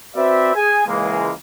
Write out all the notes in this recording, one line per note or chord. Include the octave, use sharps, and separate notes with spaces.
C4 F#4 B4 C5 D5 E5
G#4 G#5
C#2 E3 G#3 A#3